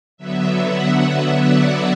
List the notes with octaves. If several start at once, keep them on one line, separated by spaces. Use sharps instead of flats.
D3 F#3 B3 E5
F#5
E5
D5